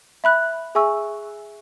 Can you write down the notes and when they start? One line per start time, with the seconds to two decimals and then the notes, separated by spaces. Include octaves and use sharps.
0.24 E5 B5 F#6
0.75 G#4 E5 G#5 C#6 E6